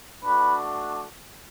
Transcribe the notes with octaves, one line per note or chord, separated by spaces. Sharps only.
A3 D4 F#4 B4